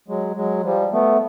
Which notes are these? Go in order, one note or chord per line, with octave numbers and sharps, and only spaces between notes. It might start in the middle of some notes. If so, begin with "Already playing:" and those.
F#3 G#3
F#3 G#3
F3 G3
A3 B3